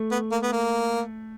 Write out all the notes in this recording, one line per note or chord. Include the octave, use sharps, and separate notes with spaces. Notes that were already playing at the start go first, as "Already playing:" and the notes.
Already playing: A3
B3
A#3
B3
A#3